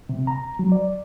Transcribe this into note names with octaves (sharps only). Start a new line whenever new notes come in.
C3
A#5
F#3
D5